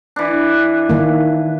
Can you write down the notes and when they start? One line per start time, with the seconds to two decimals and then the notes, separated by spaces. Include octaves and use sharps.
0.16 E3 D4
0.89 D#3 A#3